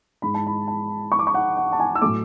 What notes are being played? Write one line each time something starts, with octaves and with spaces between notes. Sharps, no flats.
G#2 G#3 B5
A5
B5
A5
C#6
D6
C#6
F#5
F#5
A5
G#5
E6
A2 F#3 A3 D6